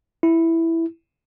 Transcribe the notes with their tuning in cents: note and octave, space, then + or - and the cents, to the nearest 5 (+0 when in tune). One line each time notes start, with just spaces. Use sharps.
E4 +0